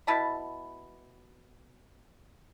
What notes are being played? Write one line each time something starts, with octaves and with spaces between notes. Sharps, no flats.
B2 E4 A5 B5